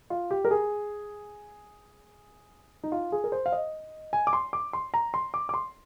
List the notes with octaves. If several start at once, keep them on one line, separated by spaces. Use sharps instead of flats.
F4
G4
A#4
G#4
D#4
F4
G#4
A#4
C5
F5
D#5
G#5
D6
C6
D6
C6
A#5
C6
D6
D6
C6